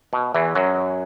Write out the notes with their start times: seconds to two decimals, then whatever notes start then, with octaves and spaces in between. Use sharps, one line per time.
0.13 B2
0.34 E2 E3
0.55 F#2 F#3